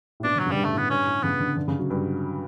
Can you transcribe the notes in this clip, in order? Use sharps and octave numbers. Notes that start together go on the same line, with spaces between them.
A2
B2 D4
D3
F#3
C#3
G3
G2
A3
A2 B3
G2 C#4
A2
C#3 B3
D3
D3
C#3
F#3
G2